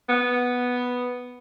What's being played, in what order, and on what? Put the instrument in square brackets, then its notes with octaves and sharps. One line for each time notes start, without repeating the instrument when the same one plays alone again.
[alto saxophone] B3